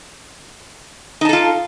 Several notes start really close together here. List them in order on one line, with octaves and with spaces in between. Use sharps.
D#4 A5 A4 F4